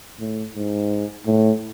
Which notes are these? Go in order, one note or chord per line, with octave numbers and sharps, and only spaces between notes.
A2
G#2
A2